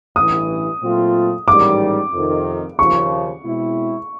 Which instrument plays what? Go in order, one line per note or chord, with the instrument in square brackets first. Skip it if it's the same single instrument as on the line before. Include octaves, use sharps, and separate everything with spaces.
[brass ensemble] A1 G2 E3 [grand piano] D#6
[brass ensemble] A#2 F#3 A3 C4 F4
[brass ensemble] A1 G#2 D#3 G3 [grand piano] D6
[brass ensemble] F2 C3 D#3
[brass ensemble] D#2 C#3 F3 [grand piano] C#6
[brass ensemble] B2 G#3 C4 E4